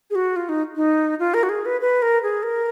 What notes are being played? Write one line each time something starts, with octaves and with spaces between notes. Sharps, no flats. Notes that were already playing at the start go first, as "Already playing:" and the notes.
G#4
F#4
F4
D#4
D#4
F4
A#4
F#4
G#4
B4
B4
A#4
G#4
A#4